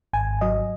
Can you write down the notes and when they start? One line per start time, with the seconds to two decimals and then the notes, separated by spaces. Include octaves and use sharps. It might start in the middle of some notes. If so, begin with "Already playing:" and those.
0.13 G#1 G#5
0.41 F#3 D#5